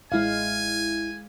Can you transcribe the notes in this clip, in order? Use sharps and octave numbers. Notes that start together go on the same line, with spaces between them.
A1 G#3 E4 F5 G#5